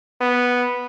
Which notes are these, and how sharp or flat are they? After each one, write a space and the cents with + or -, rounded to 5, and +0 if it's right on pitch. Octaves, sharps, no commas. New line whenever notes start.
B3 -5